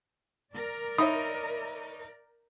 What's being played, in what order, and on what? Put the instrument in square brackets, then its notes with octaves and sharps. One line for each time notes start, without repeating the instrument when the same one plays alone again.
[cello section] A#4 D5
[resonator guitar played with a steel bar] D#4 [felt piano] C#5 E5 B5 [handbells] D#6